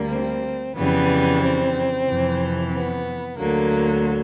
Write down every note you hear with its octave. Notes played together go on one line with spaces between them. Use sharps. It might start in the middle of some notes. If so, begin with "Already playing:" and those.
Already playing: D2 D3 G3 A#3
C4
F2 C#3 E3 G3 B3
C4
F2 C3 E3
B3
D2 D3 F#3 A#3